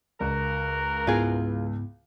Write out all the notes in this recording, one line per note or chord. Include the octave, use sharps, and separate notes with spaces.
C#2 F#4 A#4
G#2 B3 E4 F4 G#4